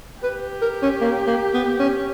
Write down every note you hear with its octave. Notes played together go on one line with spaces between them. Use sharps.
G4 B4
A#4
C#4
A#3
A#3
B3
C#4